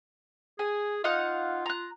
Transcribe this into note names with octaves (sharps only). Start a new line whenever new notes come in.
G#4 G#5
D#4 F4 F5 F#5
A#5 F#6